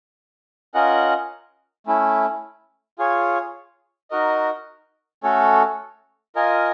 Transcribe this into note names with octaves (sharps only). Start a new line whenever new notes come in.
C#4 F4 A#4 D#5 F#5
A3 C#4 E4
F4 G#4 C#5
D#4 F#4 A#4 D#5
A3 C#4 F#4 A4 C#5
F4 A#4 D#5 G#5